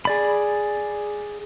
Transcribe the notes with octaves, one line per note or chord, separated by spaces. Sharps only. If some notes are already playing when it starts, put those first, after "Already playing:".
G#4 D5 B5